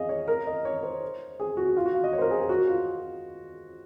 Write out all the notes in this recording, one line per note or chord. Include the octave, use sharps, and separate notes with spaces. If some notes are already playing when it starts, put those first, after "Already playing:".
Already playing: G#4 D#5 F5
C#5
A#4
D#5
C#5
C5
G#4
F#4
F4
F#4
F5
D#5
C#5
C5
A#4
G#4
G#4
F#4
F4